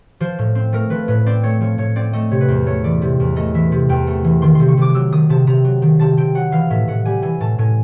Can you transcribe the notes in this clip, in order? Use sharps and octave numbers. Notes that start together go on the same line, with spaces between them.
F3 C5
A2
C4
A3 A#4
F3 B4
A2 B4
C4 D5
A3 C#5
F3 C#5
A2 C#5
C4 D5
A3 D#5
C3 C#5
B4
E2 C5
A3 C#5
E3 D5
C3
E2
A3 D#5
E3 E5
C3
E2 G5
A3
E3
D#3 C6
C3 C6
C#6
C3 D6
F#3 E6
D#3 D#6
C3 A5
C3 A#5
F#3
D#3
C3 A5
C3 G5
F#3 F#5
E3 F5
A2 E5
A2 F#5
G3 G#5
E3 G#5
A2 A5
A2 G#5